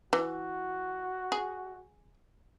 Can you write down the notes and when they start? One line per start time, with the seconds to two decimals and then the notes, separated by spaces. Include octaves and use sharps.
0.13 E3 F#4
1.32 G#4